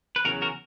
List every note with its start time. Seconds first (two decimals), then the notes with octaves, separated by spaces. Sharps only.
0.16 B4
0.25 E2 C#3 F#3 F#4 A#4
0.42 F#4 A#4